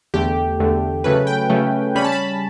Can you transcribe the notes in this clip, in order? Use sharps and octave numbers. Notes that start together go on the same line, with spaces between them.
E2 D3 A3 G4
E2 D3 A3
C#3 F#3 A3 C#4 B4
G5
C#3 F#3 A3 C#4
C#3 G3 C#4 B5
A5
B5